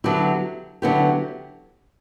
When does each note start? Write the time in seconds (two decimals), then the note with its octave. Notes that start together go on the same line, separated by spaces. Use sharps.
0.04 D3 F#3 B3 E4 G4
0.82 D3 F#3 B3 E4 G4